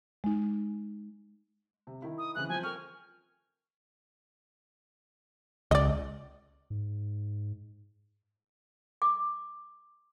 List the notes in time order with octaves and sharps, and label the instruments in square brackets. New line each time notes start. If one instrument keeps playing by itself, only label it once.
[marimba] G#3 D#4
[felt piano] C3
D#3 E4
[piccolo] D#6
[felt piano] C#3 E3 C4 [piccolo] F#6
[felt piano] F3 C4 G6 [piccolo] G#5
[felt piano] A#4 G5 C#6 [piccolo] F6
[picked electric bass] C#2 [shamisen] D5 D#5
[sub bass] G#2
[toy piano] D6